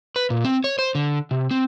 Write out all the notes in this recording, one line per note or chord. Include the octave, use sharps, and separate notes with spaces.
B4
A#2
C4
C#5
C5
D3
C3
C4